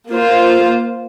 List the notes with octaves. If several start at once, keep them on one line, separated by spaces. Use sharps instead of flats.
A#3 F4 C5